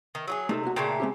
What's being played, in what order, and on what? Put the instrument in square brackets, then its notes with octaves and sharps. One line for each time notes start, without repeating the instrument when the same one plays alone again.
[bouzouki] D#3
F#3 F#4 G#4
[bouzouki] C3 [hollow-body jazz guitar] A3 D#4 A4
[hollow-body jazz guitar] C2 A#3 F#4
[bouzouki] A#2 C#3 A3 [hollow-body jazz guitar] G5
[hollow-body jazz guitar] G#3 C4 G4